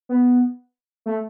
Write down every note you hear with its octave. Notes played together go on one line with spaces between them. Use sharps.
B3
A3